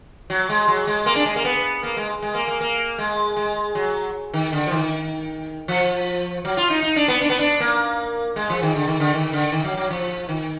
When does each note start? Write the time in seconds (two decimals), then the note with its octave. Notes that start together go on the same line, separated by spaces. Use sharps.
0.30 F#3
0.50 G#3
0.68 F#3
0.87 G#3
1.06 A#3
1.16 D4
1.26 G#3
1.36 A#3
1.45 B3
1.83 A#3
1.97 G#3
2.22 G#3
2.35 A#3
2.48 A#3
2.61 A#3
2.98 G#3
3.36 G#3
3.75 F#3
4.33 D#3
4.53 D3
4.67 F3
4.71 D#3
5.68 F3
6.45 F#3
6.57 F4
6.70 D#4
6.83 D#4
6.96 D4
7.08 B3
7.21 D4
7.30 B3
7.39 D4
7.60 A#3
8.36 G#3
8.50 F3
8.63 D#3
8.75 D3
8.87 D#3
9.00 D3
9.14 D#3
9.33 D3
9.52 D#3
9.65 F#3
9.77 F#3
9.90 F3
10.29 D#3